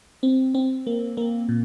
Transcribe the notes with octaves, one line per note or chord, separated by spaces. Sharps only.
C4
C4
A#3
A#3
A#2